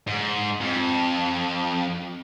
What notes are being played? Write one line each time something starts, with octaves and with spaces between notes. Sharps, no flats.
G#2
F2